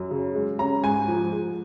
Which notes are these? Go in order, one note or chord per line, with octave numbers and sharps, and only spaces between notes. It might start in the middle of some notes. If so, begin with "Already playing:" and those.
Already playing: F#2
C#3
G#3
C#4 A#5
G#2 G#5
F3
G#3